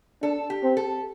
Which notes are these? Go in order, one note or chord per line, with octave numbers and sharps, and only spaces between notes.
D4 A4
G4
C4
A4